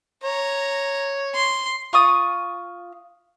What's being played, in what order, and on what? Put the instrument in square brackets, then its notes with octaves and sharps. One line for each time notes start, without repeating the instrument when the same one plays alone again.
[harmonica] C#5 [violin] A#5
[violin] C6
[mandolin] F4 C#6 D#6